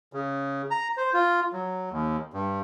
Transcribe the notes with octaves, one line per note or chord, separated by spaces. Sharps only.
C#3
A#5
C5
F4
F#3
D#2
G2